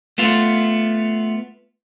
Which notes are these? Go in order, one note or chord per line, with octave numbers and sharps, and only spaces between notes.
A3 B3 F4